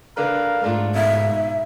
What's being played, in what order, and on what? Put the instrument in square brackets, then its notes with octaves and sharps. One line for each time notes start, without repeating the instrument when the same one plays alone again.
[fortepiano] D3 D4 B4 [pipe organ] A#4 F5
[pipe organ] G#2 [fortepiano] A3 D4 F4
[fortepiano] B2 D#4 F5 [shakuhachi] E5